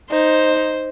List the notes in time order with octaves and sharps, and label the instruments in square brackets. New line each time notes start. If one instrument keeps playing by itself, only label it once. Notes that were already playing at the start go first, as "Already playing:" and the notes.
[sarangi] D#4 [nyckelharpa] C5